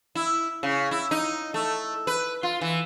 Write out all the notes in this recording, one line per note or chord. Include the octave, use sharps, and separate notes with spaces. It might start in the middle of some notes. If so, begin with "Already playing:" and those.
E4
C#3
E4
D#4
A3
B4
F4
E3